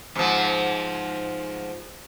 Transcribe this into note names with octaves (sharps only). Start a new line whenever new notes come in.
G#2 F3